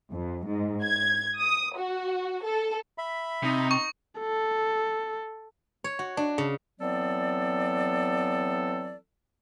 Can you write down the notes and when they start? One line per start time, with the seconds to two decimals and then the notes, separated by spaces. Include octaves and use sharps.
0.11 F2
0.46 G#2
0.83 G#6
1.38 D#6
1.77 F#4
2.44 A4
2.98 E5 B5
3.43 C3 D#4
3.71 C#6
4.20 A4
5.84 C#5
5.99 F#4
6.17 D4
6.38 C#3
6.81 E3 F#3 B3 C4 A4 D5